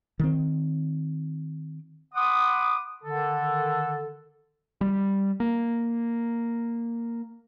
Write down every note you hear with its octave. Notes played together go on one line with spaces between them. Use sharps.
D#3 C4
F#5 B5 C6 D6 D#6
D3 D#3 A4
G3
A#3